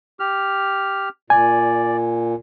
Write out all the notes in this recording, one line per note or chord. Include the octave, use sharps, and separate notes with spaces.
G4 F6
A#2 D5 G#5